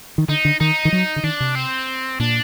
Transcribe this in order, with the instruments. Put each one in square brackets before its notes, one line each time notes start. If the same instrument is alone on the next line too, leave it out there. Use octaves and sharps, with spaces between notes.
[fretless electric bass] D#3
[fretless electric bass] D3 [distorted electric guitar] D#4
[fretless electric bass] D3
[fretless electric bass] D#3 [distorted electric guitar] D#4
[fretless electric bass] D#3
F#3
D3
[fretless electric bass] D#3 [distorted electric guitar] D4
[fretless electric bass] C3
[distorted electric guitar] C4
[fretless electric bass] A#2 [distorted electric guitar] D4